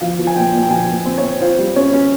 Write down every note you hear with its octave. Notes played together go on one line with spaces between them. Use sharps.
F3 F5
F3
G#5
A#2 G5
A#2
G5
F3 G#5
A#2
C4
C#5
C4
F4 C5
G3
C#4 C#5
C#4